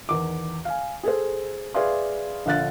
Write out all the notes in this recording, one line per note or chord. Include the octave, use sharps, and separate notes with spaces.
E2 D#3 D6
F5 G#5
G#4 A4 C5
G#4 B4 D5 E5 F5 C6
A#1 D3 F5 F#6 A6